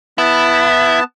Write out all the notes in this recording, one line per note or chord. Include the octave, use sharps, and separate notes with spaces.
B3 E4 A5